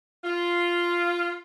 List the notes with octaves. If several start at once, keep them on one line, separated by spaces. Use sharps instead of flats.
F4